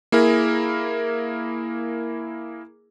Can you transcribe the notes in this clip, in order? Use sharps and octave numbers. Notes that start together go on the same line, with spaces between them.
A#3 E4 G#4 A#4